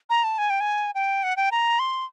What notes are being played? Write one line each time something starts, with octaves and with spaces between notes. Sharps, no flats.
A#5
A5
G#5
G5
G#5
G5
F#5
G5
A#5
C6